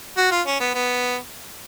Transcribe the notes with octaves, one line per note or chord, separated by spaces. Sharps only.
F#4
F4
C#4
B3
B3